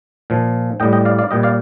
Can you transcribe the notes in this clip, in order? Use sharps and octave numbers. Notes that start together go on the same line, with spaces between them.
A#2 F3
A2 G3 D#5 G5
D#5 G5
D5 F5
D5 F5
A#2 G3 D#5 G5
D5 F5